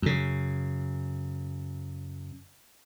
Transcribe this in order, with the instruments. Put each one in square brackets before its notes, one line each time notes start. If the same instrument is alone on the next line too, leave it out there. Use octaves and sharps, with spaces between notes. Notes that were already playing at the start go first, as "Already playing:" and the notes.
[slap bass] F#2 C#3